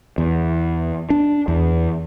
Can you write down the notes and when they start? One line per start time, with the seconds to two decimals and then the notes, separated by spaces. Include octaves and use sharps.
0.18 E2
1.10 D4
1.48 E2